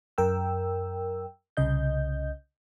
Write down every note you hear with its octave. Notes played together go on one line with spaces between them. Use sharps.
F#2 A#4 G5 E6
C2 C#3 D#5 G6